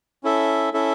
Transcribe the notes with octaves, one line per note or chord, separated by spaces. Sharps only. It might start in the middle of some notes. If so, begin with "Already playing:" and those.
C#4 E4 A4 E5
C#4 E4 A4 E5